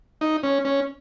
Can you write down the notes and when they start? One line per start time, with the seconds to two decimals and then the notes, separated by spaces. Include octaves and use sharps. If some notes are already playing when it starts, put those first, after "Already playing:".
0.21 D#4
0.43 C#4
0.65 C#4